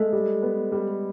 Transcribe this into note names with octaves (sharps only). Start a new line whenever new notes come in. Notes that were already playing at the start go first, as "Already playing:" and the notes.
Already playing: G#3 A3
G3
B3
G3